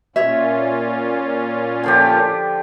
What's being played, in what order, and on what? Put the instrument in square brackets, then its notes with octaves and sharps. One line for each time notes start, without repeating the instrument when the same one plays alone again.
[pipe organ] A#2 C#4 F4 [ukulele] C#5 E5
[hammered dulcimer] D3 F3 G4